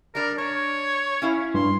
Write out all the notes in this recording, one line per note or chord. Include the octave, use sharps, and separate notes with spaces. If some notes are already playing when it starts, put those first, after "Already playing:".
G3 D4 A#4
D4 C#5
C#4 E4 F5
G2 C6